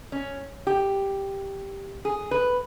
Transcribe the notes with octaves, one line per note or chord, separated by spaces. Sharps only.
C#4
G4
G#4
B4